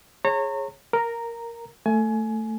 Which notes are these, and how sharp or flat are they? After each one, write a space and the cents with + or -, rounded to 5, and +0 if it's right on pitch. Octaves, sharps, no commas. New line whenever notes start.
G#4 +0 C#5 -25 A#5 -35
A#4 +0 A#5 -10
A3 +10 G#5 +25